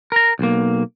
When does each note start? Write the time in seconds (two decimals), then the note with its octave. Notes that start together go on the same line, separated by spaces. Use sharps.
0.12 A#4 A#5
0.39 B1 A#3